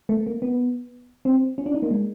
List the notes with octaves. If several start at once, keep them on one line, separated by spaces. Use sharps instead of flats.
A3
A#3
B3
C4
C#4
D4
D#4
A#3
G#3